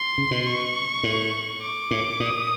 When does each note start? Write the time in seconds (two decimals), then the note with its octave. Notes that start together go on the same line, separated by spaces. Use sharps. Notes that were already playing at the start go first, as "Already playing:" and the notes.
Already playing: C6
0.18 C#3
0.31 B2
0.47 C#6
1.03 A2
1.62 D6
1.91 A2
2.20 A#2 D#6